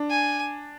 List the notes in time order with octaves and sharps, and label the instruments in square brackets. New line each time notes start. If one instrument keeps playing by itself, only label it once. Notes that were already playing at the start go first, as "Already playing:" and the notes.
Already playing: [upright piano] D4
[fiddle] G#5